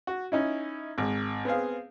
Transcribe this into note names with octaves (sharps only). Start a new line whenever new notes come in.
F#4
C#4 D#4 E4
G#1
B3 C4 G#4 F5